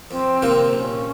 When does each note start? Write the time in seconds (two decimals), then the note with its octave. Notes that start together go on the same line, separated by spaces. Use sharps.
0.11 F2 C4
0.42 C3 D#3 A#3 F4
0.73 A#1 C#4